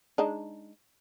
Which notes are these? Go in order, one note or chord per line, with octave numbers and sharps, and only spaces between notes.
G#3 D4 D#4